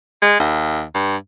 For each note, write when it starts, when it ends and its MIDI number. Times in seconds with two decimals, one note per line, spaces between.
0.22 0.36 56
0.40 0.83 39
0.95 1.16 43